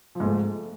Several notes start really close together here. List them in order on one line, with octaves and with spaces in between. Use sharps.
F3 G#2 A3